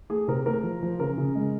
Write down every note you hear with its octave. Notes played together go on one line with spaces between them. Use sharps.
A3 G#4
C3 A#4
A3 A#4
F3
F3
C#3 A#4
C#3
G#3